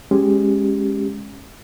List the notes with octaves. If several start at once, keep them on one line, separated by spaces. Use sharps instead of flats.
G#3 C#4 G4